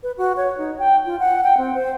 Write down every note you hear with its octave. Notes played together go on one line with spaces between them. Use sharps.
B4
F#4
C#5
D#4
G5
F4
F#5
G5
C4
C5